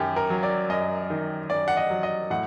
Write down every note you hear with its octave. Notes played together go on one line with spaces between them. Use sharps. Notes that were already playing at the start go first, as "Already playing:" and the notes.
Already playing: F#2 D#3 G4
A#4
F#3
D5
F#2 D#5
D#3
F#2 D5
F#5
D#5
F#3
D#5
A2 F#5